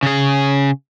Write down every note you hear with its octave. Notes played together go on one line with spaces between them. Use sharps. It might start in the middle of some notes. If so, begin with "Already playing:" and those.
C#3 G#4